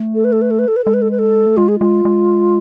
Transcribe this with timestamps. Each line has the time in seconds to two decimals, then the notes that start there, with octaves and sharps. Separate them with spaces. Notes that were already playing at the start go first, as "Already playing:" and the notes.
Already playing: A3
0.15 A4
0.24 B4
0.32 A4
0.42 B4
0.51 A4
0.59 B4
0.68 A4
0.76 B4
0.84 G#3 A4
0.94 B4
1.02 A4
1.11 B4
1.19 A4
1.46 A3
1.57 G#3 F4
1.68 G#4
1.79 G#3 F4
2.05 G#3